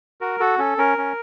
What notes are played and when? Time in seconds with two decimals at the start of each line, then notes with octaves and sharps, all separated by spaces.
0.21 F#4 A#4
0.40 F#4 A4
0.58 C#4 A4
0.78 C#4 A#4
0.98 C#4